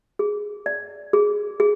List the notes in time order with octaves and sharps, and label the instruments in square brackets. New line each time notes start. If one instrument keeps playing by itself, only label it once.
[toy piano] G#4
D5
G#4
G#4